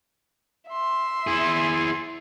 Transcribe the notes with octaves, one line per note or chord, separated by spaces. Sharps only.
E5 C6
E4 G#4